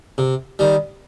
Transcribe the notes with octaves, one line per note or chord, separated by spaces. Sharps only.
C3
D#3 G3